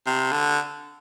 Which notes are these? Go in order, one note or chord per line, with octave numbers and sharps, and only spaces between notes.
C3
D3